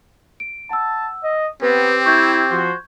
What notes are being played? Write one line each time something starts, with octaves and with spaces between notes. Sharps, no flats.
D7
F#5 A5 E6
D#5
B3 C4 G4 B4
E4 C#6 G6 G#6
F3 F#4 C5